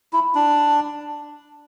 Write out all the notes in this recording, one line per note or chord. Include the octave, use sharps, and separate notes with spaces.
E4
D4